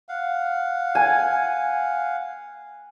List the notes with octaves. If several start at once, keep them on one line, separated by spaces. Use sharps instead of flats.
F5 F#5
G#5